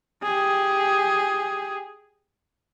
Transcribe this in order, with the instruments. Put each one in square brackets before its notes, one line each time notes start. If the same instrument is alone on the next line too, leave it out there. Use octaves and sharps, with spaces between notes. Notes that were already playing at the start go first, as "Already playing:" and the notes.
[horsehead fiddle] G4 G#4